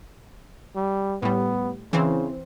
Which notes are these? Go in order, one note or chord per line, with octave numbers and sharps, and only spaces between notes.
G3
A2 G3 B3
C#3 E3 C4 C5